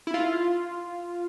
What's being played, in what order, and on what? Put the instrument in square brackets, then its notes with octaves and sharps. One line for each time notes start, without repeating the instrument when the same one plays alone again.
[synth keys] E4
F4